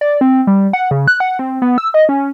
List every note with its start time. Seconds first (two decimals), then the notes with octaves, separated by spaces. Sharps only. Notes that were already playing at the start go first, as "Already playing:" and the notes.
0.01 D5
0.21 C4
0.47 G3
0.73 F#5
0.91 C#3
1.08 F#6
1.20 F#5
1.39 C4
1.62 B3
1.78 E6
1.94 D#5
2.09 C#4